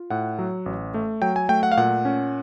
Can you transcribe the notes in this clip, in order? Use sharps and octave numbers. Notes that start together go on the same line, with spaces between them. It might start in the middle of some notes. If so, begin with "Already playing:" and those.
Already playing: F4
A2 F#5
F#3
A1
A3
F#3 G5
G#5
A3 G5
F#5
F5
A#2 F#5
C#4